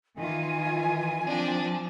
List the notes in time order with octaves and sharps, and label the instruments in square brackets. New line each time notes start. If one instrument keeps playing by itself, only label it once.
[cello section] D#3 E3 F4 [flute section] G#5
[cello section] F3 [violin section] C4 D4